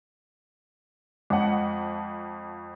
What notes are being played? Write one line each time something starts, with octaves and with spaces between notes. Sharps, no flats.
F2 F3 G#3 F#5